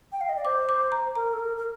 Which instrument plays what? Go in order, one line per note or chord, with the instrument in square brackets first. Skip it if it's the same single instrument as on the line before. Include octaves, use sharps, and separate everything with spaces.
[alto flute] G5
F5
D#5
D5
[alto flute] C5 [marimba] D6
[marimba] D6
A#5
[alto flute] A#4 [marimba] A#5
[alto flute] A4
A#4
A#4